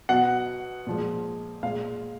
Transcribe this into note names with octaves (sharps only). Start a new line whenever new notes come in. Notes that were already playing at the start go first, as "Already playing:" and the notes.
B2 F#3 F#5
A#2 F3 G#3
A#2 G#3 F5